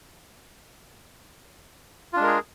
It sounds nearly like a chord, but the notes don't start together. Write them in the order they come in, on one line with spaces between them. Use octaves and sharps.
F4 D4 G#3 A#4 G#4